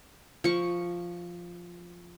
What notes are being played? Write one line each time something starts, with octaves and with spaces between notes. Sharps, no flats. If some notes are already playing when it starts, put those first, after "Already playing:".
F3 C#6